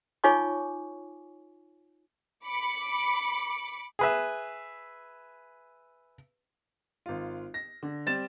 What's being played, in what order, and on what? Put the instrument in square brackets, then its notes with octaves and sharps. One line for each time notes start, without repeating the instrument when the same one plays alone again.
[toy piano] D#4 F4 C#5 G#5 C#6 D6
[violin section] B5 D6 C#7
[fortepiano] G#4 B4 E5
[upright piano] G#1 F4
A#6
D3
G3 C4 A6 E7